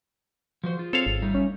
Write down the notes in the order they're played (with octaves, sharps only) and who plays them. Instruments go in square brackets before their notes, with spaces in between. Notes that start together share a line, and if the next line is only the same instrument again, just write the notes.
[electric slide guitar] F3 F#4 C5
F4 G#4
[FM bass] C4 [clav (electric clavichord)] A4 C#5 F5
[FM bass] G#1
[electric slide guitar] G3 A3 D#4
[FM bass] C#4